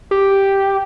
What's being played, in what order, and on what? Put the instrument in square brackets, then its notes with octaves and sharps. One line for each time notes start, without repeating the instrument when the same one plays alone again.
[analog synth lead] G4